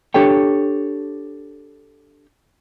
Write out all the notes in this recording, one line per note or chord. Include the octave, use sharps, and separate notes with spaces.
D4 G4 A4 C#5 G5